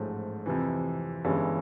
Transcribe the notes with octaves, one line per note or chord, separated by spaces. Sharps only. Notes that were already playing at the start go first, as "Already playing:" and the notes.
Already playing: A1 G#2 F3 A3
F2 C3 E3
G1 G2 E3 G#3 C#4